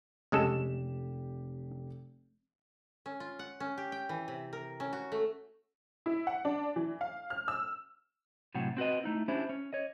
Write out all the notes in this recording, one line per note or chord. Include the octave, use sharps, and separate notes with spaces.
F1 C#3 G#3 G4 A4 E7
C#4
F4
F#5
C#4
G4
G5
E3
C3
A#4
C#4
F#4
A3
E4
F#5
D4
E3
F5
F6
E6
A2 C3 F#3 F#5
C4 F#4 B4 D#5
A3 D#4 E4
C#4 D4 E4 G4 C5
C#4
C#5 D#5